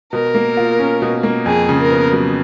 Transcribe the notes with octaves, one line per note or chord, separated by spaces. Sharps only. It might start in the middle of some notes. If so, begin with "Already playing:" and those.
B2 A#4
A#3
F4
C#4
B2
A#3
F2 G#4
C#3
A#4
B3
F#3